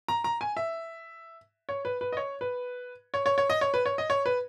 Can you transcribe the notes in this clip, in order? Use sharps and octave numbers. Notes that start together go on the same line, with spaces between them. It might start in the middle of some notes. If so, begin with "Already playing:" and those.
A#5
A#5
G#5
E5
C#5
B4
B4
D#5
C#5
B4
C#5
C#5
C#5
D#5
C#5
B4
C#5
D#5
C#5
B4